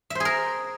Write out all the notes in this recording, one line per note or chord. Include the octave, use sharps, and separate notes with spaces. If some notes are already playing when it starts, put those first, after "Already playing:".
G#4 A#4 C5 E5